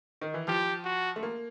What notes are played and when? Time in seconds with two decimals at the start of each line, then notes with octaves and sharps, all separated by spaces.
0.21 D#3
0.34 E3
0.48 F3 G4
0.84 F#4
1.16 A3
1.23 A#3